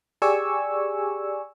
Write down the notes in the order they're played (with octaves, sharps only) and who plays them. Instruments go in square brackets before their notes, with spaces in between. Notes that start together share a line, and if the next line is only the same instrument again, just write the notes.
[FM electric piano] G4 G#4 D5 G#5 C#6 E6